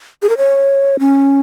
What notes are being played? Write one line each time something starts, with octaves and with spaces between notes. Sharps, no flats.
G#4
A#4
C#5
C#4